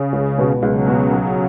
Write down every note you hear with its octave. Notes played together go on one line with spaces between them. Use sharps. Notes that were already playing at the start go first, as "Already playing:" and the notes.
Already playing: C#3
C#2
B2 B3 F#4
C#2 C#3 F#3
B2 B3 F#4
B1